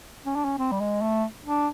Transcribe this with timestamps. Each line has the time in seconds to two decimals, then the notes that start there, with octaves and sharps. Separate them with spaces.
0.26 C#4
0.35 D4
0.44 C#4
0.58 C4
0.71 G3
0.80 G#3
1.01 A3
1.45 D4